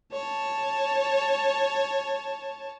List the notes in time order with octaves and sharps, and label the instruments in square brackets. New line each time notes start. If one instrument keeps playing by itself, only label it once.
[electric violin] C#5 A5